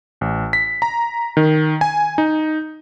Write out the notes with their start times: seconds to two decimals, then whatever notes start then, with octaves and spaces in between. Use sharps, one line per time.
0.21 A1
0.53 B6
0.82 A#5
1.37 D#3
1.81 G#5
2.18 D#4